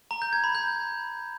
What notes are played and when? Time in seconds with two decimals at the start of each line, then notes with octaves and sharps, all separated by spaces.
0.11 A#5
0.22 G6
0.33 G#6
0.44 B5
0.55 G6